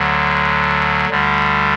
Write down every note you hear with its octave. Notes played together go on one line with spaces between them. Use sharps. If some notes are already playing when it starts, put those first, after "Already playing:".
Already playing: D2 D3 F#3
D2 D3 G3